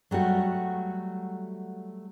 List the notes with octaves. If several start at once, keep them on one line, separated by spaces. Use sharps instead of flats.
F#3 G3 A3 F#4